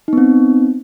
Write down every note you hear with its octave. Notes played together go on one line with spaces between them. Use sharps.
B3 C4 D#4